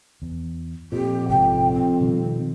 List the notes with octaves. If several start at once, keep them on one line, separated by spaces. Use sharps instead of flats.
E2
F2 A#2 G4
A#1 G#2 C3 G5
C4
B2 D#3 G3